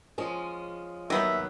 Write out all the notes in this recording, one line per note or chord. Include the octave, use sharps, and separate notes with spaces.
F3 G#3 C#4
D#2 D#3 F#3 B3 E5